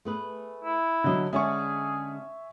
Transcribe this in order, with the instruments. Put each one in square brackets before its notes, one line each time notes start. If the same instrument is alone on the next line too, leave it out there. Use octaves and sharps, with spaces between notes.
[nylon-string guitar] A3 G#4 B4
[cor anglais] E4
[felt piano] D3 F#3 [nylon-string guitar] D4 D#5
[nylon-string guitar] D3 G#3 C#4 [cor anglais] G#4 [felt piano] E5 G#5 C#6